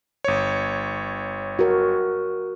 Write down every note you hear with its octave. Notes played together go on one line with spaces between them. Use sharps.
G1 C#5
F#4 A#4